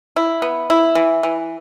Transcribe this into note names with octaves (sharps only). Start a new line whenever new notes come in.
E4
B3
E4
E3
E3